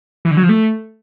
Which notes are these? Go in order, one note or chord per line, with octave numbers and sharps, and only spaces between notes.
E3
D3
F#3
F3
A3